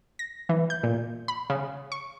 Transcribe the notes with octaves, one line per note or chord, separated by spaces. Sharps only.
A#6
E3
G6
A#2
B5
C#3
C#6